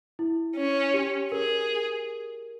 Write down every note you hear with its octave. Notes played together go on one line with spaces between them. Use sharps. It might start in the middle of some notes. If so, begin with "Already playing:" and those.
E4
C#4
G4
G#4 A#4